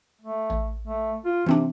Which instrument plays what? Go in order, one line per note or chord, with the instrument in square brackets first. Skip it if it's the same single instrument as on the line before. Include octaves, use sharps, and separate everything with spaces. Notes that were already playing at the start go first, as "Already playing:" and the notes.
[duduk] A3
[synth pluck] A1
[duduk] A3
F4
[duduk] C3 [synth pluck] E3 C4 D4